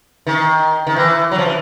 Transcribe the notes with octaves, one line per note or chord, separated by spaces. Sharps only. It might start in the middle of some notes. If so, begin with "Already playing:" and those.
D#3
D#3
E3
F#3
F3
E3